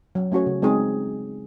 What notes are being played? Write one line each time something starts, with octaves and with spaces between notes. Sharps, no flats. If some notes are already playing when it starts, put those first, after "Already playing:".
F#3
A3 C#4 F#4 C#5
C#3
G#3 C4 D#4 G#4